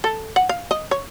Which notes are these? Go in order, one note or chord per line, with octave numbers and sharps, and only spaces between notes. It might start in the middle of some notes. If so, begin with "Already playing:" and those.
A4
F#5
F5
D#5
C#5